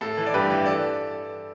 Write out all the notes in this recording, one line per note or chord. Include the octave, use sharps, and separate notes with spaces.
A2 A4
E3
D5
G2 G4 B4
E3
A4 D5